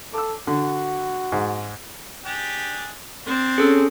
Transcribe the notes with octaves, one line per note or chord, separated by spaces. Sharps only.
A4 D6 E6
D3 F#4
G#2
D4 G4 G#4
C4 D4
C#4 G#4 A4